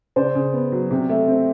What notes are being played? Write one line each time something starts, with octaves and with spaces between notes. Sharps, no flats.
C#3 C5 D5
C#3
B3
F#3
C3
A3
C4